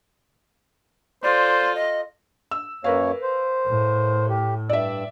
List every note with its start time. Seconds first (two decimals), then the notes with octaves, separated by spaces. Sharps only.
1.23 F4 A4 C5 D5
1.75 D#5
2.51 E6
2.84 F#2 A#3 A#4 B4 C#5 F5
3.22 C5
3.67 A2
4.29 G4
4.70 G2 D5 E5 E6